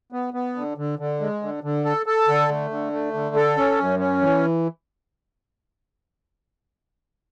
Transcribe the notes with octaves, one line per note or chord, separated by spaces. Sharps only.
B3
B3
D3
D3
D3
G#3
D3
D3
A4
A4
D3
A3
D3
A3
D3
A4
C#4
F#2
C#4
E3